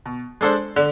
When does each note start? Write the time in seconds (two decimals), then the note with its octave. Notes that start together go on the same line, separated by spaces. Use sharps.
0.06 B2
0.41 G#3 D4 A4 C5
0.76 D3